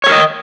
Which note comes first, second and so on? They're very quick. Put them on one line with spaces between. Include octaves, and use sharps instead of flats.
C#5 A4 A#4 D#5